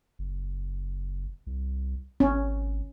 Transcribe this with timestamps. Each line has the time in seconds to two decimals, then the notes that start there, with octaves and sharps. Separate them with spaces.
0.19 F#1
1.47 C2
2.20 G#1 C#4